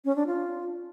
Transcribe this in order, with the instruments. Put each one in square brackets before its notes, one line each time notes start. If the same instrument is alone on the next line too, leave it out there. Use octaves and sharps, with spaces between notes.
[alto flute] C#4
D4
F4